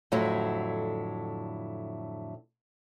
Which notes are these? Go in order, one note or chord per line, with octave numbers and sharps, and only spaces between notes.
F2 A2 D3 F#3 E4